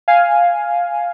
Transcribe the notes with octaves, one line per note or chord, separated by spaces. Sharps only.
F5 G#5